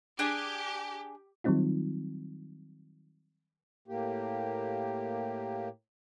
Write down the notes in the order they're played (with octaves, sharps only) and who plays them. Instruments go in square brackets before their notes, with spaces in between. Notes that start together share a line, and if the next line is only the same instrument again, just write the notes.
[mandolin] D4 G#4 G#5 [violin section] G4
[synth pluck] D#3 F#3 G3 C4 D#4 F4
[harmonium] A2 A#3 G4